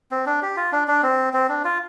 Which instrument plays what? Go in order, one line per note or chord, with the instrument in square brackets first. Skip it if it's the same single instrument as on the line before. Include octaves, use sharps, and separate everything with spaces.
[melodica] C4
D4
G4
F4
D4
D4
C4
C4
D4
F4